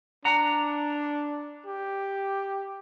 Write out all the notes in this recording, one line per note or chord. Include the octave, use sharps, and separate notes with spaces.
D4 F#5 A#5
G4